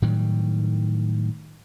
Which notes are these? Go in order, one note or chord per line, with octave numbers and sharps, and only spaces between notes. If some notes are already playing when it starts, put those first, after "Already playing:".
A2 D#3 F#3 G3